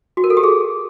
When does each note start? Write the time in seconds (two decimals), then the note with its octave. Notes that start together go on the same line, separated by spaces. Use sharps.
0.17 F#4
0.24 A#4
0.30 A4
0.37 G4
0.43 G#4